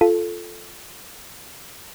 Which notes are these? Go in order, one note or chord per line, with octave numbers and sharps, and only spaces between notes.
F4 A4